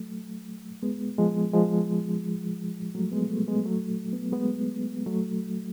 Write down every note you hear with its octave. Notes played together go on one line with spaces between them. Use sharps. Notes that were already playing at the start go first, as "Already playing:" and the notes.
Already playing: F#3 A3
G#3 B3
F3 G#3
F3 G#3
F#3 A3
G#3 B3
F#3 A3
G#3 B3
F#3 A3
B3
G#3 B3
F#3 A3